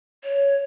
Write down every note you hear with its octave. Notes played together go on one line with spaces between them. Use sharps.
C#5